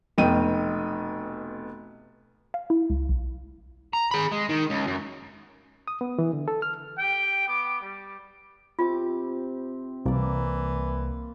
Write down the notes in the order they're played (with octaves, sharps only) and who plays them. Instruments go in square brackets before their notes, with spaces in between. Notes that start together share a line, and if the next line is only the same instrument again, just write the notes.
[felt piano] F1 B2 G5 D#7
[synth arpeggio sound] F5
E4
C#2
B1
[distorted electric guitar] A#5
G#4 B5
G#3
D#3
C#2
F#2
[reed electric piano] D#6
B3
E3
D3
A4
F6
[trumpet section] G4 G5
B3 D6
G3
[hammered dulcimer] C3 C4 D6 [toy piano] F4
[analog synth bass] C2 [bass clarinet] E3 [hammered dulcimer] A#3 D5